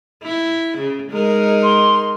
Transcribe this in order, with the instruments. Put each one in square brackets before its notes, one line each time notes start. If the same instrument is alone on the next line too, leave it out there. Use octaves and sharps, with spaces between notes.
[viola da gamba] E4
C#3
G#3 D#4 A#4
[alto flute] C6